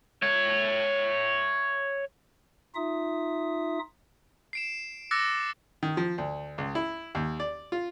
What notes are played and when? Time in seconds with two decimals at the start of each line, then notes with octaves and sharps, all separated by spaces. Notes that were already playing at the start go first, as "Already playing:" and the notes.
0.22 C#5 E5
2.75 D#4 F4 E5 D#6
4.53 C7 D7 E7
5.11 D6 E6 F#6 A6 A#6 C#7
5.83 D#3
5.97 F3
6.18 D2
6.58 C#2
6.75 E4
7.15 D#2
7.40 D5
7.72 F4